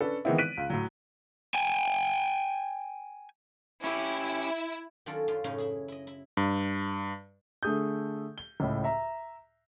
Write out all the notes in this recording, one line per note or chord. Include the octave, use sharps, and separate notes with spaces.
C#4 D4 A4 B4
D#3 E3 G#3 B3 C4 E4
F#6 B6 D7 D#7
C#2
A2 F#3
G5 G#5
C#4 E4 G4
D#3 F#3 C#4 F4 A4 D5
F#2 F4 C6
F#2 A2 C#3 C#4 D#4 D#5
E4 G#4
E4 D#5
E4
G2
D3 A3 G#4 D#6 G6
G7
C#2 A2
E5 A#5